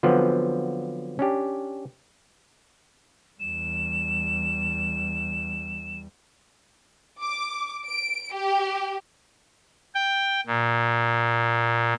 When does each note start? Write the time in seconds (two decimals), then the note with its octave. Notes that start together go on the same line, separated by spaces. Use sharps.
0.03 D3 F3 F#3 B3 C4
1.19 C#4 D4 G4
3.40 E2 G3 E7
7.21 D6
7.86 D7
8.34 G4
9.95 G5
10.46 A#2